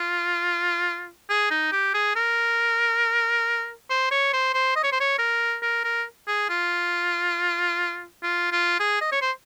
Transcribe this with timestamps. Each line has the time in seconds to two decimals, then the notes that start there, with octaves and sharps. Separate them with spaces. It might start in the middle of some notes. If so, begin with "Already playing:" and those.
Already playing: F4
1.29 G#4
1.51 D#4
1.72 G4
1.94 G#4
2.16 A#4
3.90 C5
4.11 C#5
4.33 C5
4.54 C5
4.76 D#5
4.84 C#5
4.92 C5
5.00 C#5
5.19 A#4
5.62 A#4
5.84 A#4
6.27 G#4
6.49 F4
8.23 F4
8.52 F4
8.80 G#4
9.01 D#5
9.12 C#5
9.21 C5